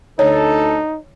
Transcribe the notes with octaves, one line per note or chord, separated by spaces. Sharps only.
D2 D#4 A4 C#5